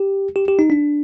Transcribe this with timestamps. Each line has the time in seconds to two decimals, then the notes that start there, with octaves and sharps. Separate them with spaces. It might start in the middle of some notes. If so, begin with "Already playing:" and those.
Already playing: G4
0.36 G4
0.48 G4
0.59 D#4
0.70 D4